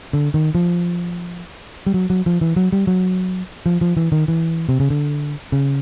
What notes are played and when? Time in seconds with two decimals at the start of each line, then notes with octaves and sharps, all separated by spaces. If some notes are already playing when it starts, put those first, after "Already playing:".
0.13 D3
0.34 D#3
0.55 F3
1.86 G3
1.94 F#3
2.10 F#3
2.26 F3
2.41 E3
2.56 F#3
2.72 G3
2.87 F#3
3.66 F3
3.81 F3
3.97 E3
4.12 D#3
4.28 E3
4.69 C3
4.80 C#3
4.90 D3
5.52 C#3